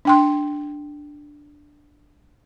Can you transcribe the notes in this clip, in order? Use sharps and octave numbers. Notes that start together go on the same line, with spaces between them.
D4 G5 C6